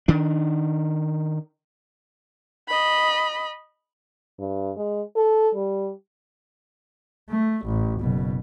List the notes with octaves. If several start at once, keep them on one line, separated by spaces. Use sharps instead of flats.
D#3 D4
D#5 B5
G2
G#3
A4
G3
A3
A1
F#1 B2